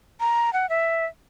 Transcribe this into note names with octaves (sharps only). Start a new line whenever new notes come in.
A#5
F#5
E5